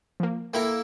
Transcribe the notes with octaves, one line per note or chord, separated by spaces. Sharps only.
F3 A#3
A#3 E4 A4 G5 A#5